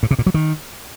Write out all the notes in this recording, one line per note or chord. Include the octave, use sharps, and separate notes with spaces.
A2
C3
A#2
F#3
D#3